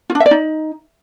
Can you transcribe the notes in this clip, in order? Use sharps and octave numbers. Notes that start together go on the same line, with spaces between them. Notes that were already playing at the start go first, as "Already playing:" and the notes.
F4
D4
E5
D5
D#4